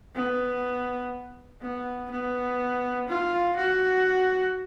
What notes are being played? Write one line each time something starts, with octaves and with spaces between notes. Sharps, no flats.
B3
B3
B3
F4
F#4